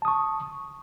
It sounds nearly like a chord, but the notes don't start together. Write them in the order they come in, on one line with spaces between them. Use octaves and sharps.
A5 D#6 C#6